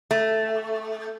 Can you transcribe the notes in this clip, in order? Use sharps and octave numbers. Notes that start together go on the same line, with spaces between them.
A3